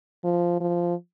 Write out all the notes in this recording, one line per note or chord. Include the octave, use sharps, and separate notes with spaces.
F3
F3